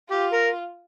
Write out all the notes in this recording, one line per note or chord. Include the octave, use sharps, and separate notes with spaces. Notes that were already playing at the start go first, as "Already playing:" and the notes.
F4 G4
A#4